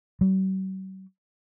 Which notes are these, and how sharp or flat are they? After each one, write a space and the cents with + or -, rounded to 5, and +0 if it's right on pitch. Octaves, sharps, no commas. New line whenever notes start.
F#3 +45